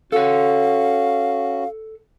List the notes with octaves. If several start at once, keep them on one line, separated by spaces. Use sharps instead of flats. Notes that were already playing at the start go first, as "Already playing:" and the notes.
C#4 F#4 A4 F5 F#5